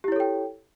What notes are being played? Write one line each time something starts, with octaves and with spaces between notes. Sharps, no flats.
E4 G4 A4 C#5 G5